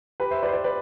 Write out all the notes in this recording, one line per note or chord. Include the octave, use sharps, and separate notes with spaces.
G4 B4
C5 E5
B4 D5
C5
B4 D5
B4 D5